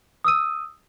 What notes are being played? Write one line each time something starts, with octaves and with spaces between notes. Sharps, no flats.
D#6 E6 D#7